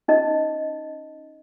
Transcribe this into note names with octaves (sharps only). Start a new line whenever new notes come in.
C#4 D#4 D#5